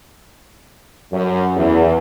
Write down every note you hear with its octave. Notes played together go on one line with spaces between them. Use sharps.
F#2
E2